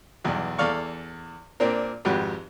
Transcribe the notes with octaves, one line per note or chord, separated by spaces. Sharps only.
B1 E2 G2
E2 A4 D5 F5 C#6
A#2 C4 D4 A#4
G#1 F2 G#2 F#4 G4 B4